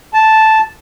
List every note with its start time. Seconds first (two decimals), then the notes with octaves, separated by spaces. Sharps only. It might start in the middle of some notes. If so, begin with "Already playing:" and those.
0.14 A5